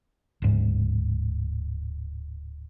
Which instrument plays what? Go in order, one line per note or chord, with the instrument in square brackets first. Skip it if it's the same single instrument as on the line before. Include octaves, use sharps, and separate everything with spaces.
[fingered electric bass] D1 G#2